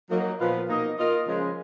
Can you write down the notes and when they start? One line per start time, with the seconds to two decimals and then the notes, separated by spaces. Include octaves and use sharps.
0.09 F#3 A#3 D#4
0.39 A#2 F3 B3 F4 B4
0.67 B2 A#3 D#4 A#4 D#5
0.98 A#3 F4 A#4 D#5
1.26 C#3 F3 G#3